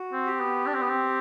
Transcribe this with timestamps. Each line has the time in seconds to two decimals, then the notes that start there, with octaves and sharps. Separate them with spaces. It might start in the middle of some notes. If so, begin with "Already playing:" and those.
Already playing: F#4
0.13 C4
0.26 G4
0.40 B3
0.66 D4
0.74 C4
0.82 B3
0.89 C4